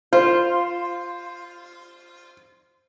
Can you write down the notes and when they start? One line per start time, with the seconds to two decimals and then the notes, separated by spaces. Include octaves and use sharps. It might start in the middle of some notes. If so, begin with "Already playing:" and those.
0.13 F4 C5